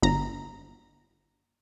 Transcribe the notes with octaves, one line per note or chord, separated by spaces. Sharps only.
G1 A#5